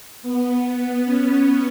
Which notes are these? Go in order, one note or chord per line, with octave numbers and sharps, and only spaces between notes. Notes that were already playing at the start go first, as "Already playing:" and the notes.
B3
C#4